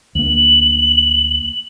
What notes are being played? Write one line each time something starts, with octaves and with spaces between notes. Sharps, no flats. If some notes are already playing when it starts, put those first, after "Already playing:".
D2 A#3 F#7